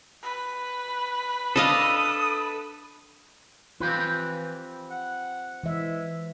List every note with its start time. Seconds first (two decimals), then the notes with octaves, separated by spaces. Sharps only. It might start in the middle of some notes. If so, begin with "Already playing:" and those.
0.23 B4
1.56 D4 A4 D#5 F5 D#6
3.81 E3 C4 F4 G4 B4
4.90 F#5
5.63 E3 G#3 E5